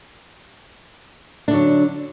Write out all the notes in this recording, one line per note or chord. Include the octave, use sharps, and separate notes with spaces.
D3 F#3 D4